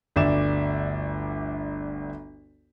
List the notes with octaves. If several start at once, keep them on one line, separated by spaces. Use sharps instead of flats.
G1 D2 D5 E5 D6 E7